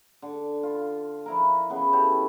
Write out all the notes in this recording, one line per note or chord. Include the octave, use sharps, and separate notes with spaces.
D3
F4
F3 E4 A#4
C#3 E3 B3
C#3 C#4 G4 A4